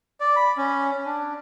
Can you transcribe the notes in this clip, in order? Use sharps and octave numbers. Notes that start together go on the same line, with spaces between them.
D5
B5
C#4
D4